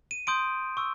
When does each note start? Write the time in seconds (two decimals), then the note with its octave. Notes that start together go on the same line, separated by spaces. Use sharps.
0.11 D#7
0.27 C6 D#6 G6 D7
0.77 C#6 E6